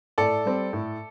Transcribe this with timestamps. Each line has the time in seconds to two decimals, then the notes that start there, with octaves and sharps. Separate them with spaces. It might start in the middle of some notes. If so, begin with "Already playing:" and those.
0.18 A2 A4 D5
0.45 G3 C4
0.73 A2